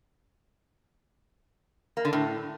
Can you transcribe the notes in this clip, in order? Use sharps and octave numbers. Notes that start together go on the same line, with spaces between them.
A#3
D3
A2